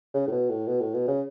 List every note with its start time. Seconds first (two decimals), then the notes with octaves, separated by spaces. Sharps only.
0.14 C#3
0.27 A2
0.32 B2
0.50 A2
0.67 B2
0.80 A2
0.94 B2
1.08 C#3